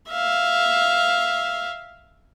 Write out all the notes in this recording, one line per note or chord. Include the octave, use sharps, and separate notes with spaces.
E5 F5